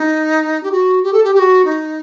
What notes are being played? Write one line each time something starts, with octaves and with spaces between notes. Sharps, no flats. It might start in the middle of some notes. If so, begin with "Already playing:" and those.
Already playing: D#4
G4
F#4
G4
A4
G4
G4
F#4
D#4